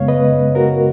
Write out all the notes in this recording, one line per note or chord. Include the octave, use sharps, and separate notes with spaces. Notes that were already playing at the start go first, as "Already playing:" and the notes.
Already playing: F#2 C#3 G#3 B3 C#5 F5
B4 D#5
F#4 A#4